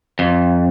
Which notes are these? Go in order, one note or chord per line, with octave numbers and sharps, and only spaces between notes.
F2